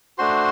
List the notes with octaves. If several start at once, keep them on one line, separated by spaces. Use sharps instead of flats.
A3 D4 F#4 C5 C6